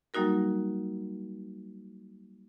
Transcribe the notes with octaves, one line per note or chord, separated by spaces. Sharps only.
F#3 G3 A#3 D#4 F#4 A#4